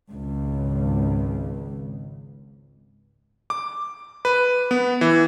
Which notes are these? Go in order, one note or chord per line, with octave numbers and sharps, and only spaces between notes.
G#1 C#2
D6
B4
B3
E3